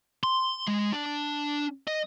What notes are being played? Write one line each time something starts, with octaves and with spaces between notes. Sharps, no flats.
C6
G#3
D4
D#5